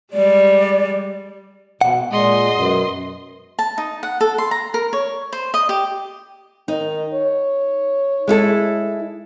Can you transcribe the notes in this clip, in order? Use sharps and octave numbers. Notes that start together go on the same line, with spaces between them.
G3 G#3 D5
B2 F#5
A#2 G#3 D#5 C6
F#2 B2
A5
D#4
F#5
A4
C6
A#5
A#4
C#5
C5
D#5
G4
D#3 D#4
C#5
G#3 E4 A4